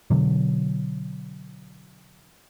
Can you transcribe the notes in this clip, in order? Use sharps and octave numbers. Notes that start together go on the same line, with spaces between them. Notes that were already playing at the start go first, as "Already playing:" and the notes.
B2 D3 F#3